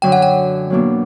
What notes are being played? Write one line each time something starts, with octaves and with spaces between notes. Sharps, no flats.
F#2 D3 F#3 G5
F#5
G5
E2 B2 F#3 A#3 D4